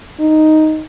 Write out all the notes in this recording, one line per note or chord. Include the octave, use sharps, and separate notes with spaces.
D#4